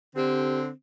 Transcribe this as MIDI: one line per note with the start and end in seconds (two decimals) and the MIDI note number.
0.16 0.70 50
0.16 0.70 60
0.16 0.60 67